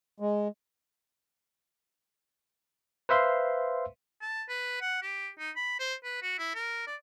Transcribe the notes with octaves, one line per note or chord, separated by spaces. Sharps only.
G#3
B4 C5 E5 F5 C6
A5
B4
F#5
G4
D#4
B5
C5
B4
F#4
E4
A#4
D5